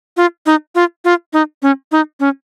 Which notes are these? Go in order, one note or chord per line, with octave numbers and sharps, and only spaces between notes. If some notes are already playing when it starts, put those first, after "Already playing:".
F4
D#4
F4
F4
D#4
C#4
D#4
C#4